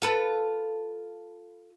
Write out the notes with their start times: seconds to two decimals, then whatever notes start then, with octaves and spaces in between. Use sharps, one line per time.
0.02 F4 A4 B4